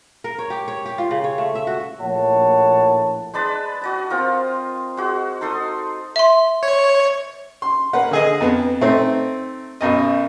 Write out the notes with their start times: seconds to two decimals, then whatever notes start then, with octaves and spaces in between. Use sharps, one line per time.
0.24 A#4
0.39 C#5
0.50 G4
0.68 C#5
0.86 G4
0.98 F4
1.11 C#3
1.24 C#5
1.38 A3
1.55 E5
1.67 F#4
2.00 A#1 A2 A#3 C#5 F#5 A5
3.34 G#3 D4 B4 A5
3.82 F#4 D#5 A5
4.10 C4 F4 A#4
4.97 G#3 F#4
5.41 D#4 A4 C6 D#6
6.16 E5 C6
6.63 C#5
7.62 C6
7.93 A#3 B4 F#5
8.11 D3 G#4 D#5
8.41 F2 B3
8.81 A3 C4 D#4
9.81 B1 F#2 D#5